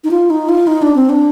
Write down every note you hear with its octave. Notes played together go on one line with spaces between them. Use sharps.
D#4
F4
D#4
F4
D#4
D4
C4
D4